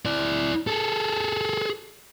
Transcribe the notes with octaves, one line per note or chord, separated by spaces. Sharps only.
E4 D5
G#4 A4